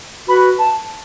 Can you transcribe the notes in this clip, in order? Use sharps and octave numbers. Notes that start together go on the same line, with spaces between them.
F#4 B4 B5
A5